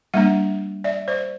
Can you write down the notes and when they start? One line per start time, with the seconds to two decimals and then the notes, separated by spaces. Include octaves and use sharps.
0.14 G3 A#3 D4 E5 F#5
0.84 D5 E5
1.08 C5 D5